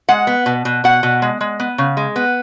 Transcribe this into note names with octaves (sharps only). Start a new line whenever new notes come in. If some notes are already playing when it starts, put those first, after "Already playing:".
G#3 F#5
B3
B2
B2
B2 F#5
B2
G#3
G#3
B3
C#3
G#3
B3